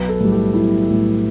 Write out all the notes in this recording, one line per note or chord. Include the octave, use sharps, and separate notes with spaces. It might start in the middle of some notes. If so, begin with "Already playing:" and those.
Already playing: B1 B4
A4
A2 G3
G4
B1 E4
A2 G3